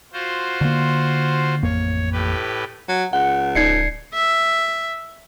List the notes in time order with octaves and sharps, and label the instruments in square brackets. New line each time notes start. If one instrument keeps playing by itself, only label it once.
[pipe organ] F4 F#4 C5
[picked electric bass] D3 A#3
[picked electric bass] A1 F2 A#3 [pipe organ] C#5
[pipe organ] A2 G4 B4
[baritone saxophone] F#3
[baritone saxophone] C#2 [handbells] F#5
[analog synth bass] D1 [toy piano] D#4 D5 E5 [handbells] G#6 C7 C#7
[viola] E5